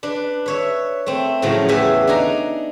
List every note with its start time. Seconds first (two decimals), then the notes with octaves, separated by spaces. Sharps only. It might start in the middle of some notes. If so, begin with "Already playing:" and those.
0.03 D4 B4
0.46 B4 C#5 E5
1.06 A3 C4
1.42 A2 C#3 F3 F#3
1.68 E2 A3 G4 B4 E5 G#5
2.07 D4 D#4 G#5 A#5